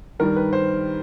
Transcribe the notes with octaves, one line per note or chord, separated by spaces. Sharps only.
G2 D#3 G3 A#4
B4
C5